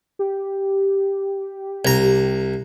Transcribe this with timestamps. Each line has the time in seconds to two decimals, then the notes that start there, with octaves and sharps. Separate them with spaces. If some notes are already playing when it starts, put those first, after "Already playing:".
0.19 G4
1.85 C2 A#5